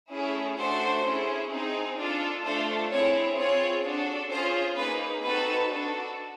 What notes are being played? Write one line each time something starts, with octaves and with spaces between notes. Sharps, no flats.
A3 C#4 E4 G#4
A3 D4 F#4 A4 C5
C#4 E4 G#4
C4 D#4 G#4
D4 F4 A4
A3 D4 F4 A4 C5
C4 E4 G#4 C#5
C4 F4 G#4 C#5
D4 F#4 A4
C#4 F4 G#4 C5
A#3 D#4 G#4 B4
C4 D#4 F#4 A4 B4
D4 F#4 A4